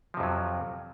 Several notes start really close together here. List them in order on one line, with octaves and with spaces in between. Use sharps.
F3 C3 F2 F#3